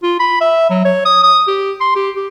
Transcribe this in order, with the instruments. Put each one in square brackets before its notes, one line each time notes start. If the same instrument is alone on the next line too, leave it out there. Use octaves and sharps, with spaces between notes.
[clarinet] F4
B5
E5
F#3
C#5
D#6
D#6
G4
C6
G4
G4